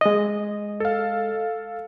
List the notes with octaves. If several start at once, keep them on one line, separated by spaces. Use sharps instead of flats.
G#3 D#5
A4 F5